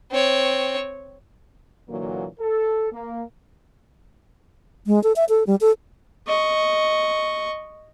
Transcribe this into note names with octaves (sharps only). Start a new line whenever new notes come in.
C4 C#5
A#2 D3 E3 F#3 A#3
A4
A#3
G#3
A4
E5
A4
G3
A4
D#5 C#6